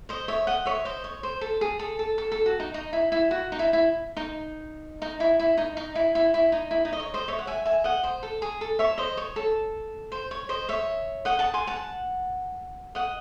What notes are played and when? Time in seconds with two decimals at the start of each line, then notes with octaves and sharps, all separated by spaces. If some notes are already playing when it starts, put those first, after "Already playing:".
0.09 C5 D#5
0.28 C#5 E5
0.47 D#5 F#5
0.65 C#5 E5
0.85 C5 D#5
1.04 C#5
1.23 C5
1.41 A4
1.61 G#4
1.79 A4
1.99 A4
2.18 A4
2.32 A4
2.46 F#4
2.60 D#4
2.74 D#4
2.93 E4
3.12 E4
3.31 F#4
3.52 D#4
3.59 E4
3.73 E4
4.17 D#4
5.02 D#4
5.20 E4
5.39 E4
5.57 D#4
5.77 D#4
5.95 E4
6.15 E4
6.34 E4
6.52 D#4
6.71 E4
6.85 D#4
6.93 D#5
7.00 C#5
7.14 C5 D#5
7.28 C#5 E5
7.39 F#5
7.47 E5 G#5
7.65 E5 G#5
7.84 D#5 F#5
8.03 C5
8.23 A4
8.42 G#4
8.61 A4
8.79 C#5 E5
8.98 C5 D#5
9.17 C#5
9.36 A4
10.12 C5
10.31 C#5
10.49 C5 D#5
10.69 C#5 E5
11.25 D#5 F#5
11.39 F#5 A5
11.54 G#5 C6
11.67 F#5 A5
12.95 D#5 F#5